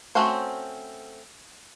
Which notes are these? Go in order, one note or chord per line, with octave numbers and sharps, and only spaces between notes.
A3 C4 C#4 F#4 C5